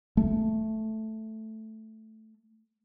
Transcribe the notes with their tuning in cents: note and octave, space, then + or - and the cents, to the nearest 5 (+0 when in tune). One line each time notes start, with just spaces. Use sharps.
A3 +0